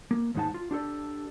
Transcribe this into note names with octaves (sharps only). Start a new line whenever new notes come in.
A#3
D#2 G#2 G#3 D#4 F#5 A5
F4
D4 G4 A4 D5